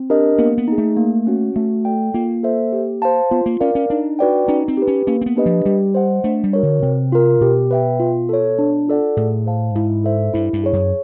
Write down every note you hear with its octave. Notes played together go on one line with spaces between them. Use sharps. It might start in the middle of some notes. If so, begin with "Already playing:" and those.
Already playing: C4
D4 G4 A#4 D#5
A#3 B3
B3
D#4 G#4
A3
A#3
C#4 F#4
A3 F#4
A4 D5 G5
A#3 F4
A4 C5 E5
G4
C5 F5 A5
B3 F4
A#3
C#4 A#4 D5 F5
C#4
D4 D#4
F#4 B4 D5 G5
C#4 D#4
C4
G4 B4
C#4
A#3 C#4
C4
B3
D4 G4 B4 D#5
F3
G3 G4
C5 D#5 F#5
A3 D4
G3
F#4 A#4 C#5
D3
C3 C4
F4 A#4
B2 G4
B4 E5 G5
F4
A4 C#5
D4
F4 A4 D5 F#5
A2 G#4
C5 F5 A5
G#2 E4
A4 C5 E5
G2 E4
G2
G#4 C#5
F#2